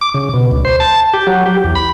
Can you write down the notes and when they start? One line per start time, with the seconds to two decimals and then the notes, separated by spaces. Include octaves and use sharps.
0.01 D6
0.14 C#3
0.34 B2
0.51 D2
0.65 C5
0.80 A5
1.13 G4
1.27 F#3
1.46 G4
1.64 E2
1.75 B5